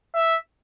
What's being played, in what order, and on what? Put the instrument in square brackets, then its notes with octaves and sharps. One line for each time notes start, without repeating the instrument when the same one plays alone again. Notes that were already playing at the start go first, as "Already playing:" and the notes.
[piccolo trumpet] E5